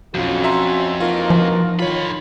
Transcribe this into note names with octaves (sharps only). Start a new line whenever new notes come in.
B1 F2 C#4 F4 F#4
E5 A#5 C6
E3 A#3 D#4 F4 F#4 A#4
F3
D3 D#3 F4 C#5 B5